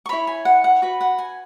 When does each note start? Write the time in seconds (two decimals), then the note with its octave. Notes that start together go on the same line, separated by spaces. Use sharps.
0.06 C#6
0.09 E4 C#5 B5
0.27 G#5
0.45 F#5
0.64 F#5
0.82 F#4 B4 B5
1.01 F#5
1.18 G#5